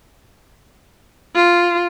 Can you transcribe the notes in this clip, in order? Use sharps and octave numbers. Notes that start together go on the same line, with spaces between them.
F4